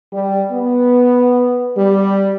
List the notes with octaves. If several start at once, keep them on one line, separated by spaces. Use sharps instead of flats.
G3
B3
G3